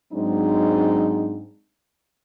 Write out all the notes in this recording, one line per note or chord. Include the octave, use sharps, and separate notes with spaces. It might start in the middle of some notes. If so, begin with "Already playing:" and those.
G#2 F#3 G#3 C4 D4 D#4